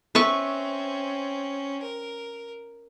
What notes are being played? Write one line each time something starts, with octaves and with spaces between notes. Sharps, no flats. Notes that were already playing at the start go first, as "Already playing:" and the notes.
C4 C#4 B4 E5 C#6
A#4